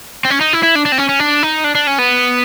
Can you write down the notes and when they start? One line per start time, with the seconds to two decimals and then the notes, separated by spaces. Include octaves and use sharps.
0.25 C4
0.30 C#4
0.41 D#4
0.53 E4
0.63 E4
0.76 D4
0.86 D4
0.92 C4
0.98 C#4
1.09 C#4
1.19 D4
1.43 D#4
1.64 D4
1.75 D4
1.87 C#4
1.98 B3